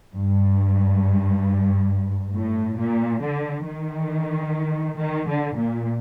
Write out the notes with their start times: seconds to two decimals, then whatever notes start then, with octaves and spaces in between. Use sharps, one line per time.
0.14 G2
2.35 A2
2.78 A#2
3.22 D3
3.65 D#3
4.98 D#3
5.28 D3
5.56 A#2